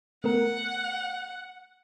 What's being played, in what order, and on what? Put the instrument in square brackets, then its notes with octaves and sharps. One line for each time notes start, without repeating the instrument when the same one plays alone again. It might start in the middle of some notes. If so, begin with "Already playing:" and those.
[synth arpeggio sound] A3 B3 A#4 [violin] F#5